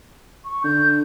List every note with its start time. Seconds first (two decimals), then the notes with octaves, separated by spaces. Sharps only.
0.45 C#6
0.64 D3 G6